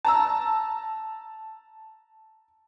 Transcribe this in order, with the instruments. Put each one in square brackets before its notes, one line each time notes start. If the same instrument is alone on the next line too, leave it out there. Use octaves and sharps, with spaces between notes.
[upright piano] A5 A#5 E6